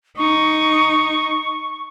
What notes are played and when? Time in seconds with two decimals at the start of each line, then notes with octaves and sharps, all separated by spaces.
0.17 D#4 C#6